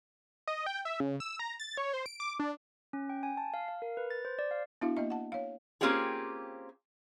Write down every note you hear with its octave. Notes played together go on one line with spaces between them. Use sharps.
D#5
G5
E5
C#3
E6
A#5
A6
C#5
C5
D7
D6
D4
C#4
G5
G#5
A5
F5
F5
A#4
B4
A6
C5
D5
F5
B3 D4 E4 F#4 E5 F5
A#3 D#5 E5
F#5 A5
C#5 F5
A#3 C4 C#4 F4 G4 G#4